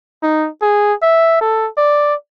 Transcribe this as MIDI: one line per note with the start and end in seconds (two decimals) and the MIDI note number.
0.23 0.48 63
0.62 0.93 68
1.02 1.41 76
1.41 1.68 69
1.77 2.14 74